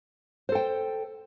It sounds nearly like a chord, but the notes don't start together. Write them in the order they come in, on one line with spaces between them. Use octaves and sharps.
C5 A4 G5